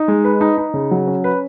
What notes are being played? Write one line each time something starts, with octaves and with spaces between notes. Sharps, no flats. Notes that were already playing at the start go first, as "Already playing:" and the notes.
Already playing: D#4
G#3
B4
D#4
D#4
C#3
F#3
C#4
B4